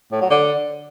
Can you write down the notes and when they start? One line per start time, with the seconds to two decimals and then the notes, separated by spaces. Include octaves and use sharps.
0.12 A2
0.21 F#3
0.30 D3